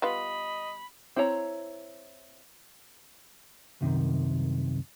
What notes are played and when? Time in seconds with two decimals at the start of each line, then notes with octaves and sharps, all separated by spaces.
0.02 G3 B3 F4 D#5 B5
1.16 C4 E4 B4 C#5 A#5
3.81 C2 F#2 C3 D#3